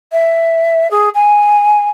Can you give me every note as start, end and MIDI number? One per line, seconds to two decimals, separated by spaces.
0.12 0.90 76
0.91 1.09 68
1.14 1.88 80